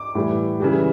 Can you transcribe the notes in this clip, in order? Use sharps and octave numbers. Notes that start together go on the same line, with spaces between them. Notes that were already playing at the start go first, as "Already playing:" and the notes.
Already playing: D6
A2 E3 G3
C#3 E3 G3